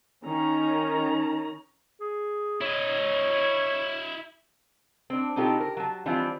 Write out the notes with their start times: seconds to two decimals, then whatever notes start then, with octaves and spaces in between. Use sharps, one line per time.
0.25 D#3 C#4 A#5
2.00 G#4
2.61 E4 C#5 D#5
5.10 C4 D4
5.36 B2 C4 D#4 F4 G4 A4
5.60 A#4
5.77 F#3 A5
6.06 E3 F3 G3 C4 D4 F4